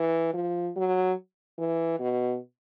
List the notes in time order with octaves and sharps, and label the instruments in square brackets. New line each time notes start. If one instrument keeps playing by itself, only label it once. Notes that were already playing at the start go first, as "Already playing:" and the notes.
Already playing: [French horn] E3
F3
F#3
E3
B2